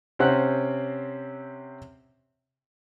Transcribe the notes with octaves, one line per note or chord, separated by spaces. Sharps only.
C3 C4 C#4 F#5 F#6